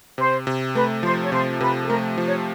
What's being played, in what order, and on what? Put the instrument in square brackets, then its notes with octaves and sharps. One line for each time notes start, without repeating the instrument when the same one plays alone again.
[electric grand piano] C3 [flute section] C5
[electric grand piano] C3
[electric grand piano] A3 [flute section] B4
[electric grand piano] F3 [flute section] C5
[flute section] C#5
[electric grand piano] C3 [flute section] C5
[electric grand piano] C3 [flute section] B4
[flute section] A4
[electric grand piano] A3 [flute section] A#4
[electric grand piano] F3
[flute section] C#5